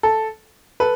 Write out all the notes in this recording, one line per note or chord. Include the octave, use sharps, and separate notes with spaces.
A4
A4 B4